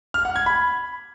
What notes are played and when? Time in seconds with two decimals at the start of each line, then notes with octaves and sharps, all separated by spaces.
0.14 F6
0.25 F#5
0.36 G#6
0.46 B5